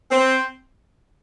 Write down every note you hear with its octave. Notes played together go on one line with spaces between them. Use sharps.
C4